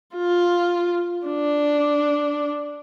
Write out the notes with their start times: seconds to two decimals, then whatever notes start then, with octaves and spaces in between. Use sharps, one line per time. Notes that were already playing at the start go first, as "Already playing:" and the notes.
0.16 F4
1.27 D4